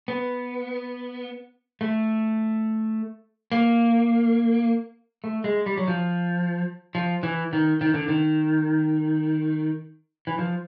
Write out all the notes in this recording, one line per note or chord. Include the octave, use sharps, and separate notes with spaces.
B3
A3
A#3
A3
G#3
G3
F#3
F3
F3
E3
D#3
D#3
D3
D#3
E3
F3